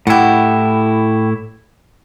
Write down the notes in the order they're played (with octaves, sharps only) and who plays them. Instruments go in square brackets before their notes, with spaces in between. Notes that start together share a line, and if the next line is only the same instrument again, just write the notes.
[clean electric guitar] A2 E4 [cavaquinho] G4 F#5